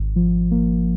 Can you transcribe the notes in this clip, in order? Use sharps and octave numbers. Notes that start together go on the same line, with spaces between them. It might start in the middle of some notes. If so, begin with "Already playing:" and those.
Already playing: G#1
F3
A#3